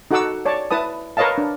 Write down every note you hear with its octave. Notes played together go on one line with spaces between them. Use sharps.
D#4 F#4 A4 F#5 D6 E6
C#5 D5 A5
E4 B4 A5 D#6
A#4 B4 C#5 D#5 F5 A5
D4